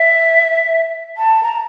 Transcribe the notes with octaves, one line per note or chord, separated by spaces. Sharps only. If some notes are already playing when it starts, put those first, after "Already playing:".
Already playing: E5
A5
A#5